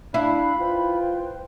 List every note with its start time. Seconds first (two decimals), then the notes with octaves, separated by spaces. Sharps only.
0.14 D4 E4 F5 B5 F#6
0.58 F4 B4 C5 G5